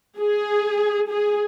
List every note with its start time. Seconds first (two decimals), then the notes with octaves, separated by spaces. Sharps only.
0.20 G#4
1.10 G#4